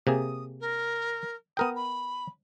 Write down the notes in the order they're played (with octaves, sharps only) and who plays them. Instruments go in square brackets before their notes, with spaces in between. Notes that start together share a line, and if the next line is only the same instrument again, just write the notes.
[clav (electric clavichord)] C3 A#3 G#4 [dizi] D#6
[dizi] A#4
[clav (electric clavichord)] B3 A#4 G5 [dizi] D#6
[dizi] B5